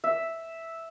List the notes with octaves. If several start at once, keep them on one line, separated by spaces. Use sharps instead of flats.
E5